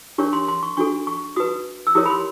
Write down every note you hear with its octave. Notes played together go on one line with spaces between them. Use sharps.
D4 G4 A#4 C#5 C#6
C6
C6
C#6
D4 F#4 A4 C#6
C#6
F#4 B4 D#6
E6
E4 G4 A#4 C#5 D#6
B5
C6